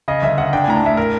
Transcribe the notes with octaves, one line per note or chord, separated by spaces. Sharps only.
C#3 D#5
G1 E5
C#3 F#5
D4 G5
G#5
A2 A#5
A5
A2 E5
A#4